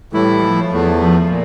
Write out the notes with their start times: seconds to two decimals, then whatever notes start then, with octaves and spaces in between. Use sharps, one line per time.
0.13 A2 E3 G3 A3 E4
0.42 F3
0.71 E2 E3 A3
1.00 F3
1.29 A#2